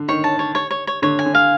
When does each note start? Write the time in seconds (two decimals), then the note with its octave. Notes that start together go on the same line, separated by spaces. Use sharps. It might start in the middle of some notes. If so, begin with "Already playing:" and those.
Already playing: D3
0.08 D#3 C#5
0.24 A5
0.39 C#5
0.55 C#5
0.71 C#5
0.87 C#5
1.02 D3 C#5
1.19 G#5
1.26 D3
1.35 F5